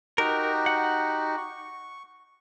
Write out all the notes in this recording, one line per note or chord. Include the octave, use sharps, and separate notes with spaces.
D#4 F#4 G4 A#4
F#5
C#6